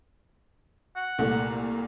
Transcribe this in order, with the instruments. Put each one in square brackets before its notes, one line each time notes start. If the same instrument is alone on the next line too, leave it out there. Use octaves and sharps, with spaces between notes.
[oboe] F#5
[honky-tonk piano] C2 A#2 A3